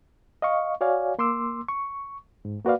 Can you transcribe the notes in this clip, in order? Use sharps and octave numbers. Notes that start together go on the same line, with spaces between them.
D#5 F5 C#6
F#4 C#5 D5 F5 G#5
A#3 C6 D6 E6
C#6
G#2
A#3 F#4 B4 D5 F5